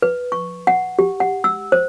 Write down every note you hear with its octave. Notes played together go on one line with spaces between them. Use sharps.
B4
C#6
F#5
G4
F#5
E6
C5